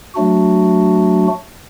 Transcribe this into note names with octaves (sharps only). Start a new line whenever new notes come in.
F#3 A3 D4 F#4